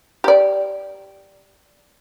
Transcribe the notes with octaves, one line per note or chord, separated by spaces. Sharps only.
G4 D5